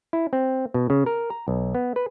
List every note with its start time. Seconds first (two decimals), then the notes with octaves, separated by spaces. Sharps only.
0.13 E4
0.33 C4
0.74 B2
0.90 C#3
1.06 A#4
1.30 A#5
1.48 B1
1.75 B3
1.96 B4